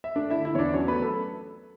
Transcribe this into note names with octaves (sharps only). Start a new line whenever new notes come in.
E5
A3 D4 D5
E4 E5
D3
E4 E5
E2 D4 C#5 D5
F#3 C#4 C#5
A3 B3 B4
A4